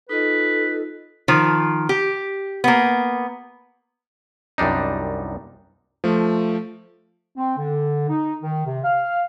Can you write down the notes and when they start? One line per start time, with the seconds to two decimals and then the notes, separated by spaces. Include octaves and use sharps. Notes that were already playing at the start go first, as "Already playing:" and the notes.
0.09 D#4 F4 A4 B4 D#5
1.28 D#3 F3
1.89 G4
2.64 A#3 B3
4.58 C2 F#2 G3 D4 D#4
6.04 F3 A3
7.37 C4
7.58 D3
8.08 D#4
8.43 D#3
8.66 C3
8.84 F5